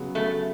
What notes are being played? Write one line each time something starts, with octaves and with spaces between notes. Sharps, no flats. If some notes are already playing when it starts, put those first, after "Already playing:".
Already playing: C#3 F#3 B3
C#3 A3